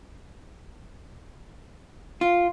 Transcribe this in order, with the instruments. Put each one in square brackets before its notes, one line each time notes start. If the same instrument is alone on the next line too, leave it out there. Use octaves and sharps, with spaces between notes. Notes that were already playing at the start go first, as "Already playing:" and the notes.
[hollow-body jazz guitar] F4